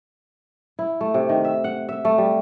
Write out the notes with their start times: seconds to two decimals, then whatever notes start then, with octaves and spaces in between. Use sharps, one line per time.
0.79 E4
1.01 A3
1.14 C3
1.29 D#3
1.44 E5
1.64 F#5
1.89 E5
2.05 A3
2.18 G3